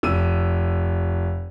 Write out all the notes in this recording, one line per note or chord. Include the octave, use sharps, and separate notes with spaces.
F1 E6 D#7